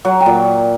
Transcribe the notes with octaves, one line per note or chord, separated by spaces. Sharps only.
F#3 F#5
G5
A#2